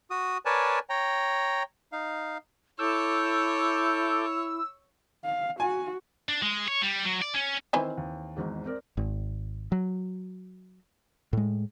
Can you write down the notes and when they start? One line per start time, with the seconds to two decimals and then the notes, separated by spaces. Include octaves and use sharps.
0.11 F#4 D#6
0.46 A#4 B4 C#5 D5 G#5 A5
0.90 C#5 G5 A#5
1.92 D#4 F5
2.79 E4 A4 C#5 D6 E6 G6
5.25 F5
5.60 F#4 G#5
6.29 D4
6.42 G#3
6.68 C#5
6.82 G3
7.05 F#3
7.22 D5
7.34 C#4
7.73 D#3 E3 C4 C5 G#5
7.98 D#2
8.36 G#1 E2 G#2
8.66 C4 A#4 D5
8.97 G#1
9.72 F#3
11.33 A2 G#3